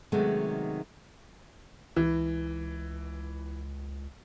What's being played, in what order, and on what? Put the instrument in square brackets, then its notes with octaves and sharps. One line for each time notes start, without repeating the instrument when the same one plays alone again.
[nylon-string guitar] C3 D#3 F#3 G#3 A3 B3
[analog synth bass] C#2 [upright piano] E3